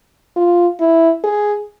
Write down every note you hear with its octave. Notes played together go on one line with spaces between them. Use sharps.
F4
E4
G#4